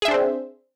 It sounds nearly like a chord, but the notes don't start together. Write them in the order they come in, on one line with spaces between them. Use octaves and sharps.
G#4 E5 D4 C5 C4